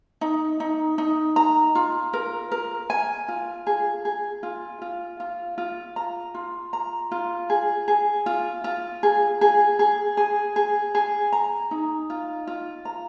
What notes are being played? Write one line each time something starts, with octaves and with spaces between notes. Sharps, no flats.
D#4
D#4
D#4
A#5
F4
A#4
A#4
G#5
F4
G#4
G#4
F4
F4
F4
F4
A#5
F4
A#5
F4
G#4
G#4
F4
F4
G#4
G#4
G#4
G#4
G#4
G#4
A#5
D#4
F4
F4
A#5